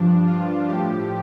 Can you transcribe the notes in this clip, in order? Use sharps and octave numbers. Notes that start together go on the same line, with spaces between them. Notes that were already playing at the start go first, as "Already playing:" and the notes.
Already playing: G2 F3 D4
F4
A2 F3 G4